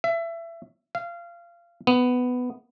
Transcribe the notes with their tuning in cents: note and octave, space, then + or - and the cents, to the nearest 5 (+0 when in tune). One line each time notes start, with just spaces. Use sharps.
E5 +25
F5 -25
B3 +10